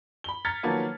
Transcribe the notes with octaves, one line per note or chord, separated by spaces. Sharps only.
B5 G7
A#5 F6 G#6 A6 B6 C#7
D#3 F3 F#3 A#3 B3